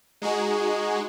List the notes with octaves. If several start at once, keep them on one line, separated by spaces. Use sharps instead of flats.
G#3 D#4 F#4 G#4